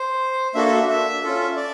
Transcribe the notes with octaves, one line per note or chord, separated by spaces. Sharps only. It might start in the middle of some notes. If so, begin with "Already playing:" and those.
Already playing: C5
A#3 D4 F#4 A4 E5
E5
E5
E5
C#4 F4 A4
D5